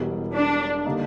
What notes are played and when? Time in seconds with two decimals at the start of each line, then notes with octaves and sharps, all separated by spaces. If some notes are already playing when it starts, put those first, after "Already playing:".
Already playing: E1 E2 B2 G3
0.35 D4
0.85 D3 G3 A#3 D#4